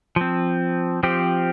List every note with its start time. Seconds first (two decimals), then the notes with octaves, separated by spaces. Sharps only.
0.16 F3 C4
1.03 F3 C4 G4